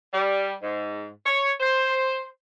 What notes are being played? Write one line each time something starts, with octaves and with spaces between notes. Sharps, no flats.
G3
G#2
C#5
C5